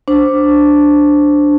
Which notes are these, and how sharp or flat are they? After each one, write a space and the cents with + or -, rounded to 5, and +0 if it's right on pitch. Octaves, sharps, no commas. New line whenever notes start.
D4 +0 C5 +0